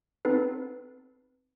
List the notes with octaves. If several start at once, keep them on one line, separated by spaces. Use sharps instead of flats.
B3 C4 D#4 A4 B4